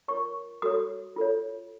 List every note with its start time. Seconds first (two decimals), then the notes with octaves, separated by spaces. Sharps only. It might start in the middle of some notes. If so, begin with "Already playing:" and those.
0.08 F4 A#4 C#5 C#6
0.62 F#4 A4 C#5 D#6
1.16 F4 A4 C#5